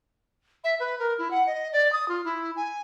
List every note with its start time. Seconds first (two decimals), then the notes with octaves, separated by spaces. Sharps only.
0.64 E5
0.80 B4
0.99 A#4
1.18 E4
1.31 F#5
1.46 D#5
1.72 D5
1.92 D#6
2.08 F4
2.24 E4
2.56 G#5